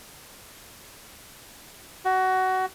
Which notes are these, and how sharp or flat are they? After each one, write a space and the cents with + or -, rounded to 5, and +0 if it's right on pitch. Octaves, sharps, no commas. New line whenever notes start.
F#4 +20